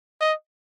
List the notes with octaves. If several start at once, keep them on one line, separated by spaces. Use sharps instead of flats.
D#5